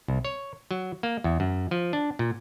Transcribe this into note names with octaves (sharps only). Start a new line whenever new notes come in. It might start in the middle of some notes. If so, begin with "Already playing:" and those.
C2
C#5
F#3
A#3
E2
F#2
F3
D4
A#2